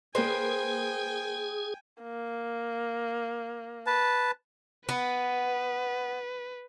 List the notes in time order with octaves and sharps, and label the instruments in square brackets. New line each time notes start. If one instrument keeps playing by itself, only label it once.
[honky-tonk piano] A#3 B4 [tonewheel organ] G#4 [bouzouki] C5 A#5 [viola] G5 G#5
[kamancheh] A#3
[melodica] B4 A5
[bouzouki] B3 [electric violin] B4